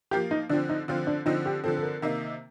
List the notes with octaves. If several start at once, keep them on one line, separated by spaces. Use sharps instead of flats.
F3 A#3 F4 G4
D#4
D3 F3 C4 D4
D#4
D3 F3 C4 F4
D4
D3 F3 C4 D#4
G4
D3 F3 C4 A4
A4
A#4
C3 D#3 A#3 D#4